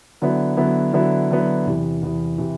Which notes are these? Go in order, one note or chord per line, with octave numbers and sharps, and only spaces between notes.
D3 F#3 B3 E4
D3 F#3 B3 E4
D3 F#3 B3 E4
D3 F#3 B3 E4
E2 C3 E3
E2 C3 E3
C3 E3